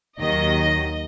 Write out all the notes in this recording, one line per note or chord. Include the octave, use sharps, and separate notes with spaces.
D#2 D#3 F#3 D#5